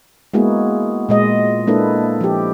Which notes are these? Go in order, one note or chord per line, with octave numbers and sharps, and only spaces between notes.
G#3 A#3 B3 E4 F#4 G#4
A#2 G#3 D#5
G#3 A#3 D4 E4 A4 B4
F3 G4